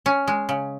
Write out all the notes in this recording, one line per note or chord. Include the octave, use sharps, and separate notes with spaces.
C#4
G#3
C#3